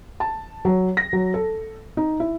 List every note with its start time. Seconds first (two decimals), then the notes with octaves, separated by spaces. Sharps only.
0.20 A5
0.65 F#3
0.97 A#6
1.13 F#3
1.34 A4
1.97 D#4
2.20 E4